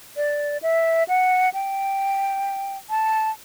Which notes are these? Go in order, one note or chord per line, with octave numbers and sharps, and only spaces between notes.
D5
E5
F#5
G5
A5